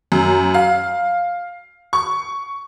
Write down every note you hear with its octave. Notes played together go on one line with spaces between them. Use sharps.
F#2
F5
C#6